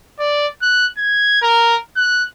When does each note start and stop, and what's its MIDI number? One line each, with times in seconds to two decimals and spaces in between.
0.19 0.47 74
0.62 0.86 90
0.98 1.37 92
1.42 1.76 70
1.96 2.24 90